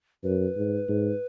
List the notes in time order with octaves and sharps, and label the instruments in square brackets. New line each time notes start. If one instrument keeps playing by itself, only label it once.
[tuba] F#2 [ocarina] B4
[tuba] G#2
G#2